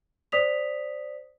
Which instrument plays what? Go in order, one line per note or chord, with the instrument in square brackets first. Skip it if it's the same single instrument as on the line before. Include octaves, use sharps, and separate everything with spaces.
[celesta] C5 D5 D#6 B6 F7